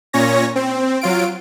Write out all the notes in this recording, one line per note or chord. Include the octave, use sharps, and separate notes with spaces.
A#2 C#4 C#5 A#6
C4
F#3 F4 D7